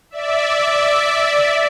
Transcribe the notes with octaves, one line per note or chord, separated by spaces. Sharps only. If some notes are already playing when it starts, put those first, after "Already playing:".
D5 E5